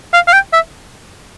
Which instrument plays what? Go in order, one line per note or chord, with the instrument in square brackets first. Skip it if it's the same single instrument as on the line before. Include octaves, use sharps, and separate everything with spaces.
[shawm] F5
F5
G5
E5